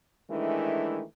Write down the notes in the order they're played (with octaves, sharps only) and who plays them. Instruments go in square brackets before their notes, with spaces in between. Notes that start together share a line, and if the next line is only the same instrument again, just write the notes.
[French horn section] D#3 E3 G#3 A3 D4 E4